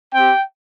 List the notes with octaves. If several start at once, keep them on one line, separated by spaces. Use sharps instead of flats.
C4 G4 G5